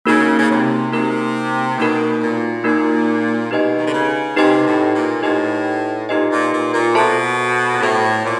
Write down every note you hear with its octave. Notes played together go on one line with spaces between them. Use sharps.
C#3 A#3 D#4 F#4 A#4
C#3
C3
C3 A#3 D#4 F#4 A#4
B2 A#3 D#4 F#4 A#4
A#2
A#2 A#3 D#4 F#4 A#4
B2 D#4 G4 B4 D#5 G#5
D#3
D3
C#3
C3 D#4 G4 B4 D#5 G#5
A2
A#2
A2 D#4 G4 B4 D#5 G#5
A#2 D#4 G4 B4 D#5 G#5
A#2
A#2
A#2
B2 F#4 A4 C5 E5 A5
A#2
A2 F#4 A4 C5 E5 A5
A#2